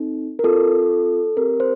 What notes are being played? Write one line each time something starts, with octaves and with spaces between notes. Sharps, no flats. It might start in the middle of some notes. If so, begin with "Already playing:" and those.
Already playing: C4 D#4 A4
A#4
C4 F4 A4
C4 G4 A#4
C5